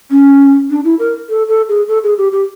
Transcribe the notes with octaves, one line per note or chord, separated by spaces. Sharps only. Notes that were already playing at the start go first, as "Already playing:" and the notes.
C#4
D4
E4
A#4
A4
A4
G#4
A4
G#4
G4
G4